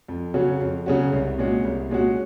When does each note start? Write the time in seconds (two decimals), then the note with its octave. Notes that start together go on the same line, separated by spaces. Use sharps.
0.08 F2
0.34 C#3 F#3 C#4 F#4
0.60 F2
0.86 C#3 F#3 C#4 F#4
1.13 C2
1.38 A#2 G#3 C#4 F#4
1.64 C2
1.90 A#2 G#3 C#4 F#4